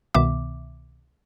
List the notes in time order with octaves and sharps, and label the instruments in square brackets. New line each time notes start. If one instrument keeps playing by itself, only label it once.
[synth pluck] C2 B2 D#3 B3 E5 D6